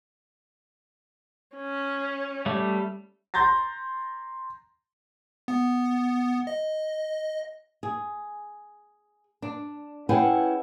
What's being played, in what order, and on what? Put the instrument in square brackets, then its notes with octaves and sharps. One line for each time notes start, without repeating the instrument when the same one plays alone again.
[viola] C#4
[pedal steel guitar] G3 A3
[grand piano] A#5 C6 G6 A6 A#6
[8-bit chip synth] B3
D#5
[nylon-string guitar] G#4
D4
C#4 E4 G#4 B4 F#5 G5